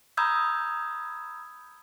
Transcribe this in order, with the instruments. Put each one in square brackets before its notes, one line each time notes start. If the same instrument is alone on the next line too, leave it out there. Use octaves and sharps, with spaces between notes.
[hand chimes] A#5 B5 D#6 E6 G6 G#6